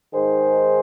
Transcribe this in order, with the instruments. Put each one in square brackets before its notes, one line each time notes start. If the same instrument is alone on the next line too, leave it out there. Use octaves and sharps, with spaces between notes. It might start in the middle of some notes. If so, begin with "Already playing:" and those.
[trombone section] G#2 D#3 G#4 C5